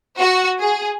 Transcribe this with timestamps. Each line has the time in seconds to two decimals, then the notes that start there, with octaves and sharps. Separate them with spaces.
0.19 F#4
0.60 G#4